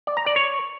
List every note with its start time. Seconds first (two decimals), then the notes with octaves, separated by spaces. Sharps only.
0.07 D5
0.17 A#5
0.26 D5
0.36 C#5